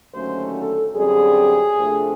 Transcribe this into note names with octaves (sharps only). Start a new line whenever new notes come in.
D#2 D3 F#3 A3 C#4 C5
A4
F#2 D3 G3 C4 G#4
C3 F3 A3 D4